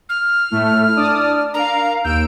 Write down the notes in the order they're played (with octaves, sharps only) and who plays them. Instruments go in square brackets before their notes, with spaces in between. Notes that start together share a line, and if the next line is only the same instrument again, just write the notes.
[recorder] F6
[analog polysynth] A2 A3 [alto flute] E4
[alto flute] D4 [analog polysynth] D5 A5 D#6
[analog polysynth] A#4 F5 [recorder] A#5
[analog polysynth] D#2 E6 D7 [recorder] G6